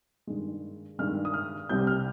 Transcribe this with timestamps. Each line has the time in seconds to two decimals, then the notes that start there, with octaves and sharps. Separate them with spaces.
0.27 G2 D#3 G#3
0.99 G2 D#3 G#3 F6
1.25 D#6
1.34 F6
1.69 C2 C3 G3 G6
1.87 F6